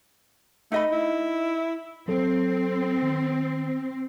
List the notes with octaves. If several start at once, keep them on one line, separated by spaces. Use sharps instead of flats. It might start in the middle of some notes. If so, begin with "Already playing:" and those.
A3 D#4 D#5 B5
E4
F#3 C4 A4
D#3